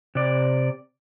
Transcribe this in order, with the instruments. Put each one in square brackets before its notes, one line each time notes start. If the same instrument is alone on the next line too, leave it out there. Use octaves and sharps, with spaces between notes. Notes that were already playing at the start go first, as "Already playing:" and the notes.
[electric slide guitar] C3 D5